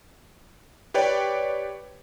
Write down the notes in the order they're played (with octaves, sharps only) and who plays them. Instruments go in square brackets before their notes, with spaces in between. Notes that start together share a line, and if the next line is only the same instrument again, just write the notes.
[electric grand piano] G4 B4 C#5 D5 G5